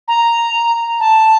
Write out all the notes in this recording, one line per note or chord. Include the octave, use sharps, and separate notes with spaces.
A#5
A5